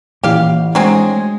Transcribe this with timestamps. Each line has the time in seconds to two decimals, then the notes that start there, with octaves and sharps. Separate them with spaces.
0.23 A1 A#2 G4 F5
0.75 F#3 G#3 A3 C4 D4 G#4